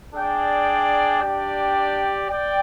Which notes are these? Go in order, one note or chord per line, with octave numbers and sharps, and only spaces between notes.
D4 G#4 D5 G5
D4 G4 D5 G5
D5 G5